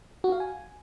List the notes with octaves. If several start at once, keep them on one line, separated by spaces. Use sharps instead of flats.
F#4
F5
G#5